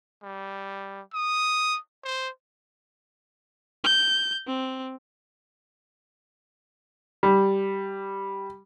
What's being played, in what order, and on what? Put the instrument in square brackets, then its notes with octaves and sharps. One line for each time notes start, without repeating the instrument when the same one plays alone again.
[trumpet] G3
D#6
C5
[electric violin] G6
C4
[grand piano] G3